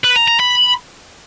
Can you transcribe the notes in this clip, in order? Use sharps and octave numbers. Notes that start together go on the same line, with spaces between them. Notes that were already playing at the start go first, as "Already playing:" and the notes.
B4
A#5
A#5
B5